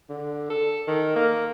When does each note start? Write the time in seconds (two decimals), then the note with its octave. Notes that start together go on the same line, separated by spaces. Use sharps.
0.10 D3
0.50 A4
0.88 D#3
1.16 A#3